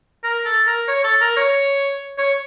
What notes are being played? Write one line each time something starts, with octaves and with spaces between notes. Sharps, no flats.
A#4
A4
A#4
C#5
A4
A#4
C#5
C#5